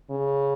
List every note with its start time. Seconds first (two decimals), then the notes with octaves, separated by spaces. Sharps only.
0.10 C#3